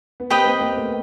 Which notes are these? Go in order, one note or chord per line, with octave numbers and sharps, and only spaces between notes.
B3
A#3 C4 G4 B4 D#5 G5
A#3 C4
A#3 C4
A3 B3